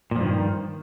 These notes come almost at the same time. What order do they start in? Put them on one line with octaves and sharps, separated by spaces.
A#2 F3 G2 D#3